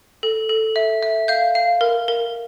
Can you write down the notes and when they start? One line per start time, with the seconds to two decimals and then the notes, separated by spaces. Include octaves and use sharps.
0.23 A4
0.49 A4
0.76 E5
1.03 E5
1.28 F5 G6
1.55 F5
1.81 A#4
2.08 A#4